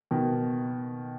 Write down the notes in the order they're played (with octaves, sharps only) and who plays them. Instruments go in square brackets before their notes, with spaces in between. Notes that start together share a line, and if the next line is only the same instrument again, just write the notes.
[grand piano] B2 D#3